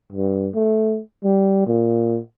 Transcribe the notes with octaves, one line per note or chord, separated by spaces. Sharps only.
G2
A3
G3
A#2